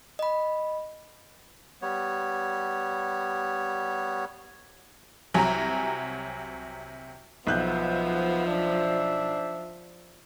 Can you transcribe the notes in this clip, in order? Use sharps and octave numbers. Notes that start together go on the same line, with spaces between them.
D#5 B5
G3 B3 C#5
C2 C3 F#3 G#5 A#5
B1 F3 B3 C5 E5 F#6 G6
D4